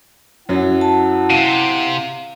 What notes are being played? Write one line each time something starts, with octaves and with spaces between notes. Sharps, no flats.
F#2 F#3 E4 F#5
A5
C3 F5 D#7